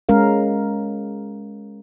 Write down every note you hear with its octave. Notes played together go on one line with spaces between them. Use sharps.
G#3 C#4 A#4 F5